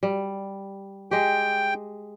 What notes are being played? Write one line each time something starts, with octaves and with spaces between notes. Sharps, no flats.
G3
G#3 G4 G5